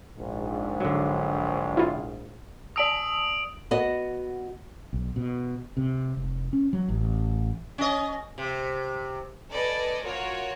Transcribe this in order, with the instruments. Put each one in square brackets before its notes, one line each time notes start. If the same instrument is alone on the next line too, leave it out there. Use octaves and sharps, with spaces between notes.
[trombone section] A#1 G#2
[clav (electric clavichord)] D3 F#3
[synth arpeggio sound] E4 F4
[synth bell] D5 A5 E6 [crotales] D#6 D7 F#7
[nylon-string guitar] B3 F#4 D#5
[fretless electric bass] B1
B2
C3
F1
C#4
F#3
A1
[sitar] C#4 D#5
C3
[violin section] A4 B4 D5 D#5 G#5
F4 F#4 A#4 C#5